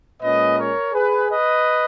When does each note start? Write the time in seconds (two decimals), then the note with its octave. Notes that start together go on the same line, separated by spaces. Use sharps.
0.23 A#2 G#3 C#4 B4 D#5
0.58 A#4 C#5
0.94 G#4 B4
1.29 B4 D#5